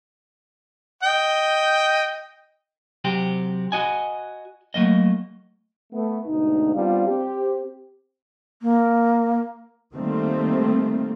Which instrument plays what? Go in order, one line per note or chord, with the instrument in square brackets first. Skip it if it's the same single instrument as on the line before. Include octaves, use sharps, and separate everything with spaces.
[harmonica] D#5 G5
[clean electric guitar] C3 F#3 C4 G4
F#4 D#5 G#5
F#3 A3 A#3 D#5
[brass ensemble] A3 B3
D2 G#2 B2 D#4
G3 B3 C4 D4 F4 F5
C4 G4
[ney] A#3
[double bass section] D#3 G3 A3 A#3 C4